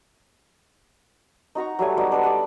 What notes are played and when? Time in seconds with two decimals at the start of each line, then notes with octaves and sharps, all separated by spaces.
1.55 D#4 F#4 A#5 C#6
1.79 F#3 G3 A3 G#5
1.97 G3 B3 D#4 F#4
2.12 D4 D#4 B4
2.23 A4 D5 F#5